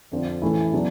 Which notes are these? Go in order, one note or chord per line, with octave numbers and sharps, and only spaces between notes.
F2 D3 F3
A2 E3 A3 C#4 E4
C#3 F#3 B3 D4